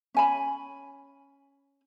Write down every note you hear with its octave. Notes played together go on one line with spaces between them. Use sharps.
C#4 G#5 B5